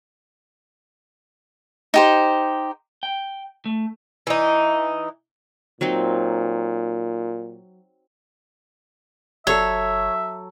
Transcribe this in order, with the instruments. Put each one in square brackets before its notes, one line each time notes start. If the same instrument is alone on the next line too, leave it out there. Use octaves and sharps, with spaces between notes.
[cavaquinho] D#4 G4 C5
[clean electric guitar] G5
A3
[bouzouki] E3 D#4
[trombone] A#2 [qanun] F#3 C4 D#4
[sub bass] F#1 [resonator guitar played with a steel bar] F#3 A4 [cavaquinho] C#5 [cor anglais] E5